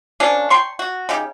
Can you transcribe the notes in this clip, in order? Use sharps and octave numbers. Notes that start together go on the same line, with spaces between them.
F3 A#3 C#4 D4
G5 A#5 C6 C#6
F#4
C#3 D#4 G4